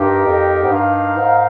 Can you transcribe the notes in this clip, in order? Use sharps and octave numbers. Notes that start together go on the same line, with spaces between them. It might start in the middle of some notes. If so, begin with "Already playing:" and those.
Already playing: G2 D#4 G4 A#4
F2
G#2
G2 D#4 A#4 F5
G#2